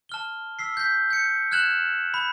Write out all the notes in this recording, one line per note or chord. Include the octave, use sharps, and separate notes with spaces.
A5 F6 G7
E6 B6 C7
G6 B6
G6 C#7
F6 F#6 G#6 E7 F#7
B5